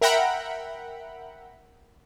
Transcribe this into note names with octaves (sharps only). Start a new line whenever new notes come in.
A#4 E5 F#5 G5 A#5 B5